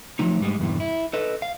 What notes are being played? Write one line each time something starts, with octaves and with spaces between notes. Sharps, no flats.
F3 F#3 A3 D#4
G#2 G3 G#3
E2 G2 B2 E3
E4
A4 B4 D#5
F5